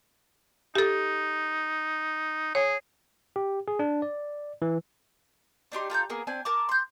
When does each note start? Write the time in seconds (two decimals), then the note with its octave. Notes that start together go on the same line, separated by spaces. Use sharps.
0.75 D#4 G4 A4
2.55 G#4 C#5
3.36 G4
3.68 G#4
3.79 D4
4.02 D5
4.62 E3
5.72 D4 D#4 G4 C6
5.90 F4 A4 A#5 G6
6.10 A#3 B3 G#4 A#4
6.27 C4 D4 G#5
6.45 A#4 A5 D6
6.69 C6 G6